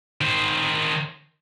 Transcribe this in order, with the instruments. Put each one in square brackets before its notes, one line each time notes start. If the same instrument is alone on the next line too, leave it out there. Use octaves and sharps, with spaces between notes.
[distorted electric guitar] D#3 C5